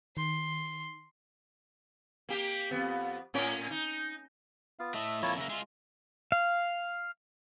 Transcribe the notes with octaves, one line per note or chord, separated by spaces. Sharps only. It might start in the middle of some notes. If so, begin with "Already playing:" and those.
D#3 C6
A#3 G4
F2 B3
A2 C#4 A#4
D#4
B3 F4 F5
A2 A3 D#5 E5
F2 A#3 E4 F4 A4 C#5
C#3 A#3 E5
G#3 F4
F5